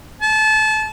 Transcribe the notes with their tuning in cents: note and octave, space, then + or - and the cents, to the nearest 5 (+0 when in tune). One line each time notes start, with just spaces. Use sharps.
A5 -30